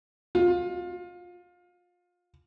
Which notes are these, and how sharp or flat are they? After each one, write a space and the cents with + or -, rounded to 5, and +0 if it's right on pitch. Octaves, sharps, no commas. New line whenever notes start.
F4 +25